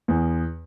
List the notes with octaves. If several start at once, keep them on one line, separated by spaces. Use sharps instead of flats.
E2